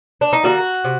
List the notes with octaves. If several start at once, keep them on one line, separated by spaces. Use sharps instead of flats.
D4
D#4
D#3 G3 A#3 F#4
C3